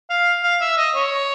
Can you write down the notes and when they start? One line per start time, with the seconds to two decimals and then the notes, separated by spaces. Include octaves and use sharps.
0.10 F5
0.43 F5
0.61 E5
0.77 D#5
0.95 C#5